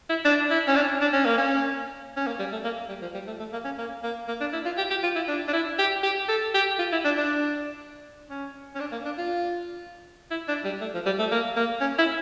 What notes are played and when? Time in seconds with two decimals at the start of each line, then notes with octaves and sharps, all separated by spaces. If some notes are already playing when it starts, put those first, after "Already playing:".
0.09 E4
0.25 D4
0.50 E4
0.67 C#4
0.76 D4
1.01 D4
1.13 C#4
1.25 A#3
1.38 C#4
2.17 C#4
2.27 A#3
2.39 G3
2.52 A3
2.64 A#3
2.89 G3
3.01 F3
3.14 G3
3.27 A3
3.39 A3
3.52 A#3
3.64 C#4
3.78 A#3
4.03 A#3
4.28 A#3
4.41 D4
4.53 E4
4.65 F4
4.77 G4
4.90 G4
5.03 F4
5.15 E4
5.28 D4
5.48 D4
5.53 E4
5.79 G4
6.03 G4
6.28 A4
6.54 G4
6.79 F4
6.92 E4
7.05 D4
7.17 D4
8.30 C#4
8.75 C#4
8.80 D4
8.92 A#3
9.05 D4
9.18 F4
10.31 E4
10.48 D4
10.64 G3
10.81 A3
10.94 F3
11.06 G3
11.19 A3
11.31 A#3
11.56 A#3
11.81 C#4
11.99 E4